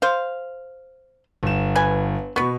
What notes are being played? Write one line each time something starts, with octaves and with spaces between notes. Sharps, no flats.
C5 F5
G1 E7
B4 G#5
B2 B3 B4 C#6